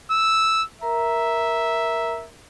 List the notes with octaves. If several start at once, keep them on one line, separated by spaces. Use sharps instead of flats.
E6
A#4 E5 A#5